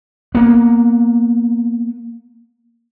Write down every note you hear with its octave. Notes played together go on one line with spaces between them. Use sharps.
A#3 B3